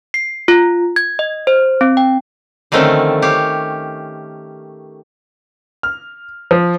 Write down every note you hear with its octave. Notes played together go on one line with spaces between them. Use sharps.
C7
F4
G#6
D#5
C5
C4
G5
D3 D#3 F3 A3 C4 C#4
G4 C#5 F5
F6
F3